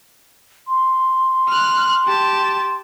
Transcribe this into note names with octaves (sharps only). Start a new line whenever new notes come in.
C6
F6 F#6
G4 A5